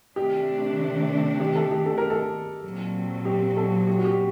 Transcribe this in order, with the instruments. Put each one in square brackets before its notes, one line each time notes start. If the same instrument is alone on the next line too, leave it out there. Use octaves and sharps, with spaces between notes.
[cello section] C3 D#3 A3 D4 [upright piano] G4
[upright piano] G4
A4
G4
A4
A#4
A4
[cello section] A#2 F#3 C4
[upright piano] G4
A4
G4
F#4
G4